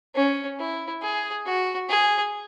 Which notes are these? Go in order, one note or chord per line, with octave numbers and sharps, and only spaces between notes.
C#4
E4
G#4
F#4
G#4